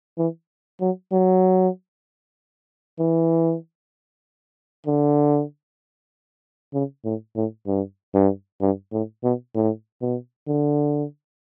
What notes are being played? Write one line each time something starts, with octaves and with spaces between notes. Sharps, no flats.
E3
F#3
F#3
E3
D3
C#3
A2
A2
G2
G2
G2
A2
B2
A2
B2
D3